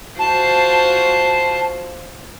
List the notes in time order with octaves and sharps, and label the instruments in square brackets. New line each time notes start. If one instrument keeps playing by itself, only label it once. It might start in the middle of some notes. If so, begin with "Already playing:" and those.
[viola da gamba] F4 F#4 C5 [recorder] A5